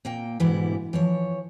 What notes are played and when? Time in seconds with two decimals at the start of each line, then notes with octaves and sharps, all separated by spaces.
0.05 A#2 A#3 G5
0.40 G#2 B2 D3 E3 G3 E4
0.93 E3 F3 C#5